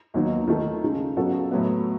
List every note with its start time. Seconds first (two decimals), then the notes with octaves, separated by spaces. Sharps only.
0.14 D#2 D#3 F#3 B3 D#4
0.48 D#3 A3 E4 A4
0.83 C#3 G#3 D#4
1.17 C#3 F#3 B3 F#4 A4
1.51 A2 F#3 B3